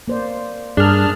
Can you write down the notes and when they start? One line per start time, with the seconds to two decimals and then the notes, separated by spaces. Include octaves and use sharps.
0.08 A#3 C5 D5
0.77 G2 D4 G#4 A#4 F6